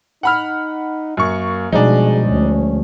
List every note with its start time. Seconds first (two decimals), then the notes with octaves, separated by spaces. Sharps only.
0.23 D#4 F#5 B5 F6
1.17 F#2 A#3 C#6
1.72 B2 F3 G3 G#3 D4 D#4 G#4
2.28 D2 C#4